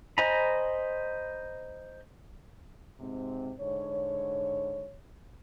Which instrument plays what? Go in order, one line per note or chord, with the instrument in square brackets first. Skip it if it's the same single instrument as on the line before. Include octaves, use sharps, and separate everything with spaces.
[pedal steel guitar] C5 D#5 G#5 A#5 B5
[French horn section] G#2 C3 C4
G#2 D3 C#5